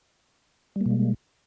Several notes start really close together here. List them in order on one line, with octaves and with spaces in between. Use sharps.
G3 A#3 B2 G#3